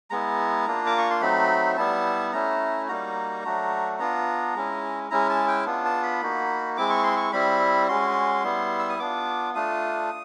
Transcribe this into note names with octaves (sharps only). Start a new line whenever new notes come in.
G#3 B3 E4 A#5
A#3 D4 F4
D6
C#6
C6
F#3 A3 C4 D#4 B5
G3 B3 E4 A5
A3 C#4 E4 A#5
G3 A#3 D#4 F#4 A#5
F#3 A3 D4 F#4
B3 D4 F4 A#5
G#3 C#4 E4
G#3 C#4 E4 A#5
A5
G5
B3 D4 F4
A5
B5
A#3 D#4 F#4
G#3 C4 E4 D6
C#6
C6
C#6
G3 C4 E4 B5
G#3 C#4 F#4 C6
G3 B3 E4
E6
D#6
B3 D4 F4 D6
A3 D4 F4 D#6